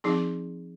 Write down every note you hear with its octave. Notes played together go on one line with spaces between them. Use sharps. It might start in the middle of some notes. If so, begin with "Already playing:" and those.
F3 C4 D#4 G#4